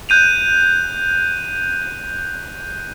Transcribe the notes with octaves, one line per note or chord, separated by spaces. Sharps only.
F#6 G6 D#7 F7